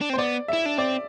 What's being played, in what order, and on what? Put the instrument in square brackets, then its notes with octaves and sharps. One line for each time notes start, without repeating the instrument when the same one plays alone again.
[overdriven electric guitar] D4
C4
[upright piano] C5
[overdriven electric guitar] B3 [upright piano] D5
[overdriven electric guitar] E4 [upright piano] E5
[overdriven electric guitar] D4
[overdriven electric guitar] C4 [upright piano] D5